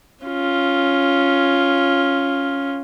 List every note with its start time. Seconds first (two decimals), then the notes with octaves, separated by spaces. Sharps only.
0.24 C#4 F4